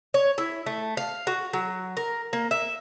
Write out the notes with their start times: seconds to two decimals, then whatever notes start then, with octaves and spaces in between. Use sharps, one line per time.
0.14 C#5
0.38 E4
0.66 A3
0.97 F5
1.27 F#4
1.53 F#3
1.97 A#4
2.33 A#3
2.51 E5